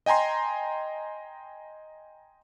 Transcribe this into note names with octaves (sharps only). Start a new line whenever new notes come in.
D#5 G5 G#5 A#5 C6